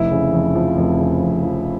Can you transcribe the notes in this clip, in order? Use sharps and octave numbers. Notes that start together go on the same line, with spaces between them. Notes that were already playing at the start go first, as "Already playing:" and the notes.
Already playing: F1 E4
C#3
F2
F3
F1
C#3
F2
F3